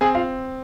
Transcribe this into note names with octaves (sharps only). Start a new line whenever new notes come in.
C4 G#4 G#5
F4 F5